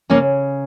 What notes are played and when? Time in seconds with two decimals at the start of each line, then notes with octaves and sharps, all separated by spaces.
0.10 C#3 A#3 C#4